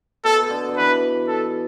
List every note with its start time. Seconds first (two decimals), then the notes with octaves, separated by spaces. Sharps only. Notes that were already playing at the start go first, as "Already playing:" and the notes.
0.24 B2 A4
0.42 B2
0.50 D3
0.69 D3
0.77 E3 B4
1.28 A4